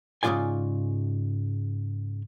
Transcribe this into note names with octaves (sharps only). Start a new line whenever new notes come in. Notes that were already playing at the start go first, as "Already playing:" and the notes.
G#2 C#3 F3 F4 D5 G#5